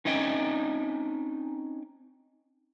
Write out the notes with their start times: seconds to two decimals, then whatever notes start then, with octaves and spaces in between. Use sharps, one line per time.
0.05 C4 C#4 D#4 D#5 G5 G#5